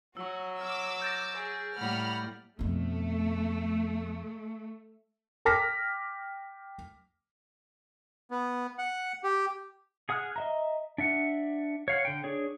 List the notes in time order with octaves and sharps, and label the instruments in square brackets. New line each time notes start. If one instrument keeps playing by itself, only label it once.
[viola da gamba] F#3 [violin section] F#4 [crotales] C#6 E6
[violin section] D6 E6 [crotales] F6
[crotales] G6 A6 A#6
[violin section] G#4 [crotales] D7
[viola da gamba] A2 G3 A#3 [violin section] F#5 B5 F6
[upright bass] F2 B2 [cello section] A3
[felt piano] G5 D6 F6 A#6 B6
[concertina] B3
F#5
G4
[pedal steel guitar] G#4 F#5 D#6 F6 F#6
D#5 E5 A#5
D4 E5 F#5
C#5 F5 F#5
D3 G5
D4 G#4 C#5